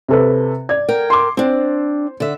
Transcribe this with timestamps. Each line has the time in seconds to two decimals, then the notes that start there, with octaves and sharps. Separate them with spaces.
0.08 C3 A4 B4
0.69 D5 G#6
0.88 A#4 G5
1.10 C6 D6
1.37 C4 D4 C5
2.20 D3 E5